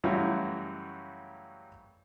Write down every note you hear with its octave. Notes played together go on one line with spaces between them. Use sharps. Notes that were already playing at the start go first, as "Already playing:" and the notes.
F#2 C#3 E3 G3 A3 F#4